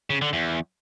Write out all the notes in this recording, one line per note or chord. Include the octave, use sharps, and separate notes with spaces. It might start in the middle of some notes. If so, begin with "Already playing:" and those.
C#3
D3
E2